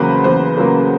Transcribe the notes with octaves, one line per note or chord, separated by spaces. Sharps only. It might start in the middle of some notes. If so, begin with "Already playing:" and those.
Already playing: E2 C#3 F#3 A#3 B4 C5
E2 C5
C#3 F#3 A#3